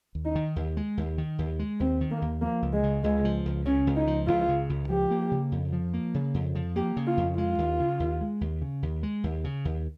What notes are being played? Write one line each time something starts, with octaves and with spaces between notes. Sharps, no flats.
D#2
D#4
D#3
D#2
G#3
D#2
D#3
D#2
G#3
D#2 C4
D#3
A#3
D#2
F3 A#3
C#2
G#3
C#3
C#2 G#3
F3
C#2
C#3 C#4
C#2
D#4
F3
C#2 F4
C#3
C#2
F3 G4
A#3
C#3
F2
F3
A#3
C#3
F2
F3
A#3 G4
C#3
F4
F2
G#3 F4
D#2
C#3
D#2
G#3
D#2
C#3
D#2
G#3
D#2
C#3
D#2